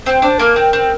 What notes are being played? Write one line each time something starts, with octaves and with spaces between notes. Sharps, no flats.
C4 C5
D4 C5
A#3 A#4
C4
C4